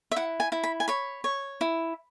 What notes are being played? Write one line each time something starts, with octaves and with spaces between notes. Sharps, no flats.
E5
E4 F#5
G#5
E4
B5
G#5
C#5 B5
C#5
E4